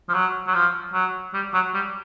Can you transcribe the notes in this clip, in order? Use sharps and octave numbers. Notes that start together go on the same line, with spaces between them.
F3
F#3
F#3
F3
F#3
G3
F#3
G3